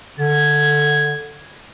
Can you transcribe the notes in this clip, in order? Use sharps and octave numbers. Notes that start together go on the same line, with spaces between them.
D3 G#6